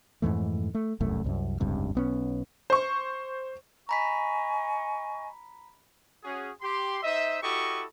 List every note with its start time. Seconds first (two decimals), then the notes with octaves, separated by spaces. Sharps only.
0.22 F2 G#2 E3 A3
0.75 A3
1.00 E1 C2 F#2 A3
1.24 C2 F#2
1.60 F1 C#2 G2 C3
1.95 B1 B3 C#4
2.70 C5 C#6
3.89 D#5 G#5 A#5 B5 C#6 B6
6.24 C#4 F#4 G#4
6.61 G4 C6
7.02 D#4 C5 D#5 E5
7.42 E4 F#4 G4 A4 D#5 C#6